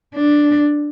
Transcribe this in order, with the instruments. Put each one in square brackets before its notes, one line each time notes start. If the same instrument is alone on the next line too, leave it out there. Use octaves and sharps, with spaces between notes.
[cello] D4